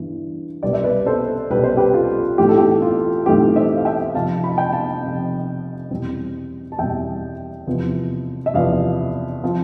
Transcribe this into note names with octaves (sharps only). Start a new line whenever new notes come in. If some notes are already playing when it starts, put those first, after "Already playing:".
Already playing: G1 G2 E3
C2 B2 G3 B3 D5
E5
B4 D5
A4 C5
C2 B2 G3 B3 B4
C5
G4 B4
F4 A4
B1 A2 E3 A3 C4 G4
A4
G4
F4
B1 A2 E3 A3 C4 G4
C5 E5
F5
E5 G5
F2 C3 F3 C4 F5 A5
B5
A5
G5 B5
F5 A5
F2 C3 F3 C4
E2 B2 G3 C4
A5
E2 B2 G3 C4 E5 G5
E2 C3 F3 B3
E5
E2 C3 F3 B3 D5 F5
F3 C4